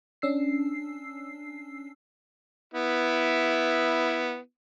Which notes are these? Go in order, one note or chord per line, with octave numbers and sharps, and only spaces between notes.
C#4 D4 E6 C7
B3 E4